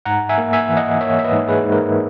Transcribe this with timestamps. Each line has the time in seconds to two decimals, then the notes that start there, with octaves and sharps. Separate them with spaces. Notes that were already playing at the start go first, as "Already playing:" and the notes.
0.05 G#2 F#5 A#5
0.29 E5 G#5
0.38 A#3
0.53 E5 G#5
0.69 E3
0.77 D#5 F#5
1.01 A#3 C#5 E5
1.19 E5
1.24 B4 D#5
1.32 G#2
1.48 G#4 B4
1.64 G#2
1.72 A#4